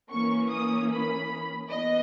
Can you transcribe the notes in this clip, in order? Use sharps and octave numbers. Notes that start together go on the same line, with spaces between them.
E3 A#3 C#4 C#6
D#6
B5
E3 B3 D#5